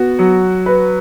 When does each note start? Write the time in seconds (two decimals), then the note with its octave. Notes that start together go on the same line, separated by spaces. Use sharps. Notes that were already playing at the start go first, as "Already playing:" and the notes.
Already playing: B3 F#4
0.19 F#3
0.66 B4